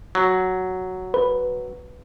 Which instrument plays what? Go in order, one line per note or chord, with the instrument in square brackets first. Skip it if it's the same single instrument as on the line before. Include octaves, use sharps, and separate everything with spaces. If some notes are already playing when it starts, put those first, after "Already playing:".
[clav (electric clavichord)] F#3
[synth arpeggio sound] B4